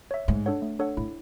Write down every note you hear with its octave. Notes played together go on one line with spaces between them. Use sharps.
C#5 E5
G#2 A3
D4 A4 C#5 F#5
A3
D4 A4 C#5 F#5
A2 E4